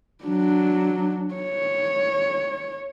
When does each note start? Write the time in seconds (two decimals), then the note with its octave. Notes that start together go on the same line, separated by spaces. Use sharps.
0.24 F#3 D4
1.34 C#5